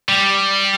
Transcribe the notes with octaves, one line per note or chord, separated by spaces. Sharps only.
G3